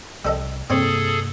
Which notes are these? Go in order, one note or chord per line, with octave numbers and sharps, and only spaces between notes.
C2 G3 A4 D#5
G2 C3 A#3 C4 G#4 A4 C#5